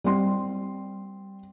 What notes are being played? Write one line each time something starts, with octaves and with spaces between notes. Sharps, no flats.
G3 C4 C6